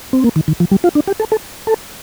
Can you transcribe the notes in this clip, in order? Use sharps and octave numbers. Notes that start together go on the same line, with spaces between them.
C4
A#3
D#3
D#3
F3
G3
F4
D4
G4
A4
A4
A4